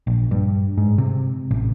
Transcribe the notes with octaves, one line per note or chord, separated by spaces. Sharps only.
A#1
G2
G#2
C3
A1